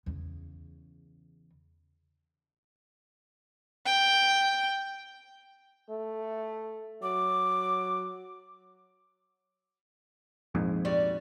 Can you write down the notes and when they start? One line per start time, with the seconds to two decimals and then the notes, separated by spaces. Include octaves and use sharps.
0.06 E2 C#3
3.86 G5
5.90 A3
7.02 F#3 D6
10.55 A#1 F2 G#2
10.85 G3 F#4 D5